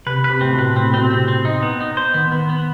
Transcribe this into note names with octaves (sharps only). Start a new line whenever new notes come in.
C3 B4
B4
C3
A2 C4
B2
B4
A2 C4
B2 C4
C3 C4
C4
D#4
B3
D#4
C5
D#3 B3
B3
B3